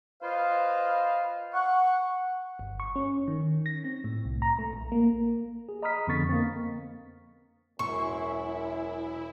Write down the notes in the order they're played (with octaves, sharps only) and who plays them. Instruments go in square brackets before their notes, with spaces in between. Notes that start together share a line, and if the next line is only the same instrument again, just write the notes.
[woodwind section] F4 B4 C5 D#5 F5
F#5 C#6
[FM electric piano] G1
C#6
C#4
D#3
A#6
C4
A2
C2
A#5
A3
A#1
A#3
[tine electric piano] G#4
D#5 A#5 B5 D#6 F6 B6
F2 D3 B3 C#6 A6 B6
A#3 C4
[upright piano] E1 C6 [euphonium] F#2 [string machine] E4 [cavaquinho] C#6